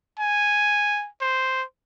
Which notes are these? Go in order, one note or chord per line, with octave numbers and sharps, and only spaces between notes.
G#5
C5